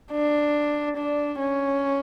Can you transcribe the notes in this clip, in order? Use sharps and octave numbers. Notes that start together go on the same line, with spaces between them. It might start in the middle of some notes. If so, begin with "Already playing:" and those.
D4
D4
C#4